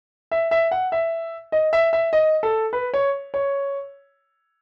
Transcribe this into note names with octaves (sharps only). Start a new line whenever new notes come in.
E5
E5
F#5
E5
D#5
E5
E5
D#5
A4
B4
C#5
C#5